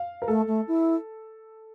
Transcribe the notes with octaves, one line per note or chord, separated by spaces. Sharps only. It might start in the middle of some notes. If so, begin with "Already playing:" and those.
Already playing: F5
A#4
A3 A4
A3
E4